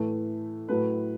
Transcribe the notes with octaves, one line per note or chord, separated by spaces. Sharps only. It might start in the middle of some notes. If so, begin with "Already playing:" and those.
Already playing: A2 E3 A3
A2 F#3 A3 B4